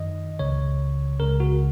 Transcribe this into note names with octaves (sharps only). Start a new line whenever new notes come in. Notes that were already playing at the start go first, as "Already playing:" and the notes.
Already playing: F#2 D#3 D#5
C#2 C#3 C#5
C#2 C#3 A#4
F#4